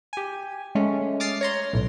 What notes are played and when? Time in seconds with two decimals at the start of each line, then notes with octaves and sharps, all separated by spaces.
0.13 G4 G#5
0.75 G#3 A3 C#4
1.20 D6 D#6 F6 A6 C7
1.41 C#5 A#5 C6
1.73 B1 A2